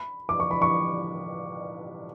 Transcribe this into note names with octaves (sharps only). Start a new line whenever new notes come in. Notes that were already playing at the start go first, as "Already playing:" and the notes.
Already playing: B5
D6
C#6
B5
C#6